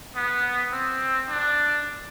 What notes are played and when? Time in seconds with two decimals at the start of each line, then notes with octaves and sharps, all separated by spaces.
0.16 B3
0.72 C4
1.29 D4